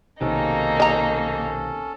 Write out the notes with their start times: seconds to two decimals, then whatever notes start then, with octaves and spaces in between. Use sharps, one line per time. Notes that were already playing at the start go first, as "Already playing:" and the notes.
0.21 B1 C3 D#3 A#3 C#4 D#4 A4
0.80 D#5 A#5